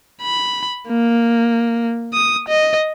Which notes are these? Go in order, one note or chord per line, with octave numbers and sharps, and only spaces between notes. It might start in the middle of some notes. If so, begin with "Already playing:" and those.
B5
A#3
D#6
D#5